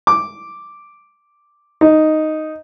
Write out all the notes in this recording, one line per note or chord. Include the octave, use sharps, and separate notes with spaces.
D6
D#4